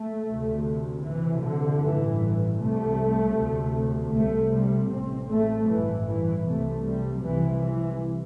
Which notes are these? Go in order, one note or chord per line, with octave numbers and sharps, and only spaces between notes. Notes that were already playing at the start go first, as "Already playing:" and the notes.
Already playing: A3
D2 C3
D2 C3 E3
D3
A1 G2 E3
C2 C3 A3
D2 C3
C2 C3 A3
G3
A1 A2 C4
A3
A1 G2 E3
E3
C2 C3 A3
G3
C2 C3 E3
E3